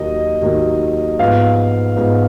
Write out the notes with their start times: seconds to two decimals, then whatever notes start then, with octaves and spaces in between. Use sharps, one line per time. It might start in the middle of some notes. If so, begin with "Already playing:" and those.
Already playing: D#2 D#3 F#3 A#3 D#5
0.42 D#2 D#3 F#3 A#3
1.19 G#2 F3 B3 F5
1.96 G#2 F3 B3